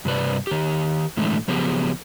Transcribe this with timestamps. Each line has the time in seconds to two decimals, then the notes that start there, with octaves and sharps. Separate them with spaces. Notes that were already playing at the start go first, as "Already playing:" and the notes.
0.05 G2 C3 B4 D5
0.47 D#3 G4
1.17 A2 D3 E3 G#3 A3
1.48 C#3 F3 F#3 B3 G4 G#4